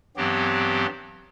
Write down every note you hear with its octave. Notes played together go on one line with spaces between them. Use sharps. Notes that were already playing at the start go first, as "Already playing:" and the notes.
G2 E3 F#3 B3 C4 G4